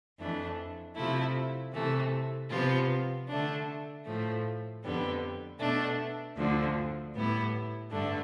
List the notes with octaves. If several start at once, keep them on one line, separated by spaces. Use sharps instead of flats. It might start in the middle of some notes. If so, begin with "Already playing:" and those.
F2 E3 A3 D4
C3 F3 A3 E4
C3 E3 A3
C3 F3 B3 F4
D3 A3 D4
A2 F3 A3
F2 D3 G3 B3
B2 A3 D4
D2 D3 F3
A2 G3 B3 E4
G2 D3 A3 D4